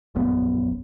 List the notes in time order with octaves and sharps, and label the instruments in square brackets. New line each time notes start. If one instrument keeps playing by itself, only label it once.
[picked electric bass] E1 A#1 F#2 B3